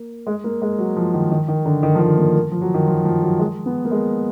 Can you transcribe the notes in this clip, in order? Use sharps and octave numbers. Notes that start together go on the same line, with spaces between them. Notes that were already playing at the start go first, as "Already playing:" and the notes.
Already playing: A#3
G#3
A#3
G#3
F#3
F3
D#3
D#3
D#3
D3
D#3
F3
D#3
A#3
A#3
F3
F#3
D#3
F3
F3
F#3
G#3
B3
A#3
G#3